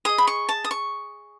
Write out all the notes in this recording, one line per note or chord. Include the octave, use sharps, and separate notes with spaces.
G#4 D#5 D#6
B5
C#6
A5
D#6
C#6